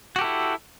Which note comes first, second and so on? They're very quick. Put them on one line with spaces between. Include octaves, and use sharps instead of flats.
F#4 G4 A4 E4